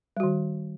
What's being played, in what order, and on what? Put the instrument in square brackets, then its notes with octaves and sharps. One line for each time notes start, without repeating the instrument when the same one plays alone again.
[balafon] G3
F#4
D#3